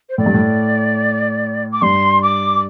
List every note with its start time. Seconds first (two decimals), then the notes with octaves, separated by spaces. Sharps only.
0.09 C5
0.18 A2 D5
0.26 G2
0.34 A2
1.72 D6
1.82 G2 C6
2.22 D6